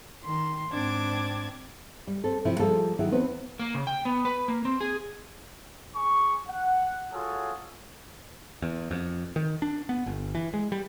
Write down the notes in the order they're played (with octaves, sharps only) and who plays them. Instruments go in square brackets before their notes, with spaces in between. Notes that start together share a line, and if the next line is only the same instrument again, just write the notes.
[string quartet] D#3 C6
G#2 C4 D4 D6 G#6
[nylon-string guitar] G3
C4 A4
C3 F3 E4
F3 G3 A#3 F4 G#4 A4
D#3 F#3 E4 G#4
E2 B3 C4 B4
[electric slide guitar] A#3
C#3
G5
B3
B4
A#3
C4
G#4
[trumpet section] G#4 C#6
F#5
F4 F#4 G#4 A4 C#5
[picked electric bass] E2
F2
D#3
D4
B3
G1
E3
G#3
G3